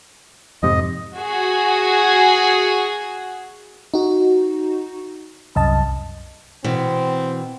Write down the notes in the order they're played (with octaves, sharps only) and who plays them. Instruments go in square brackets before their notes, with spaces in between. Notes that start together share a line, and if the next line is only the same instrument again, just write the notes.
[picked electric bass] F2 G#2 C3 [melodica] D#5
[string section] F#4 G#4
[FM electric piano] D#4 F#4
C2 F#2 D#5 A5
[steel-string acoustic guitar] B2 E3 [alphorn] C4